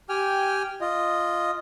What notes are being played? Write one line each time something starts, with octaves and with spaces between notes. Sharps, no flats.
G4 G5 G#5 F6
F4 D#5